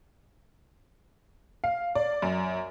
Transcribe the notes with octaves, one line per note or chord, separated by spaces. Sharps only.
F5
D5
F#2